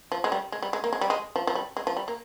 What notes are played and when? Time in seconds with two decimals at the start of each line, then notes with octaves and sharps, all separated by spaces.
0.12 F3
0.24 G#3
0.32 G3
0.52 G#3
0.62 G3
0.73 G#3
0.84 A#3
0.93 G#3
1.01 G3
1.10 G#3
1.36 F3
1.47 F3
1.55 G3
1.77 G#3
1.87 F3
1.97 G3
2.08 A#3